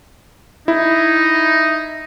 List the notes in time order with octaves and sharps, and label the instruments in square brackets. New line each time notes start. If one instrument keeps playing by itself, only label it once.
[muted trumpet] D#4 [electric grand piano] E4